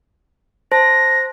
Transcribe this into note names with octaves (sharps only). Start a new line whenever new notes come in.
C5 A5 A#6